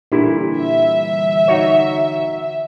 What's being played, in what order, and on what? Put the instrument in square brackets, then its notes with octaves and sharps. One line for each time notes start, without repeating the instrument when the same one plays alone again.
[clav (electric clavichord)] A#2 E4 [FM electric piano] D3 E3 G3
[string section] E5
[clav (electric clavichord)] D#4 F#4 C#5